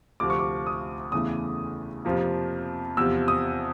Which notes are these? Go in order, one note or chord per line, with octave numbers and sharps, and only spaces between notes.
D2 C3 F3 D6
C#6
D6
D#6
E2 C#3 E3 A3 D#6
F2 C3 F3 A#3
E2 C3 F3 E6
D#6